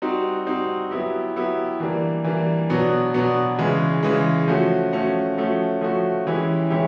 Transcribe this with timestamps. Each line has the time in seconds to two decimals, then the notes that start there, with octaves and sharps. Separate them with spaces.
0.02 G3 C4 D#4 F#4
0.47 G3 C4 D#4 F#4
0.91 F#3 B3 E4 G4
1.36 F#3 B3 E4 G4
1.80 E3 G3 A#3 D4
2.24 E3 G3 A#3 D4
2.70 B2 F#3 B3 D4
3.14 B2 F#3 B3 D4
3.58 C#3 E3 G#3
4.03 C#3 E3 G#3
4.48 F3 A3 C#4 F#4
4.93 F3 A3 C#4 F#4
5.38 F3 A3 C#4 F#4
5.81 F3 A3 C#4 F#4
6.27 E3 G#3 C#4 E4 G4
6.70 E3 G#3 C#4 E4 G4